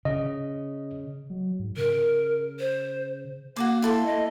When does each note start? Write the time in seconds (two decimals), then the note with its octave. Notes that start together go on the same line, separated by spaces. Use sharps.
0.05 C#3 D#5
1.30 F#3
1.59 G#2
1.77 C#3 A#4
2.60 C5
3.56 A#3 F#4 A4 D6
3.82 E4 A4 C6
4.06 D#5